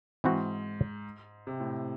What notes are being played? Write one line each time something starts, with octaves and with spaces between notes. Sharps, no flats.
G#2 E3 C4 F#4
C3
A2